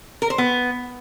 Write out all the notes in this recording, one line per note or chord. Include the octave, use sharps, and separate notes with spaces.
A#4
C5
B3